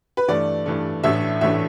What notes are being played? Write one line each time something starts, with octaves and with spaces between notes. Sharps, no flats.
B4
G2 E3 A3 D5
G2 E3 A3
A1 A2 E3 A3 D4 E5
A1 A2 E3 A3 D4 E5